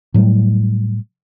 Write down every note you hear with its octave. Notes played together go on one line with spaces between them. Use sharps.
A2 F#3 G3 A3